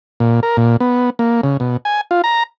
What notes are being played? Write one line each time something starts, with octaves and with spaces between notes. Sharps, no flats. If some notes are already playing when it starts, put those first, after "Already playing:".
A#2
A#4
A#2
B3
A#3
C#3
B2
G#5
F4
A#5